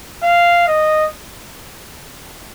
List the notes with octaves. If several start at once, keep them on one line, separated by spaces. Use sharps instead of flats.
F5
D#5